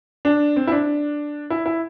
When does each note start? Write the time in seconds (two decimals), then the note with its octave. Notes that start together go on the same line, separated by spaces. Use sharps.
0.25 D4
0.56 C4
0.67 E4
0.72 D4
1.50 E4
1.66 E4